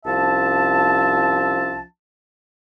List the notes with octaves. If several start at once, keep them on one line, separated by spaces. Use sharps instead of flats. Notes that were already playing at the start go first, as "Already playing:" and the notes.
C2 F3 C#4 E5 A5